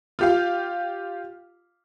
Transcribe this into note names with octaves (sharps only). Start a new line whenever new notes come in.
F4 G4 F5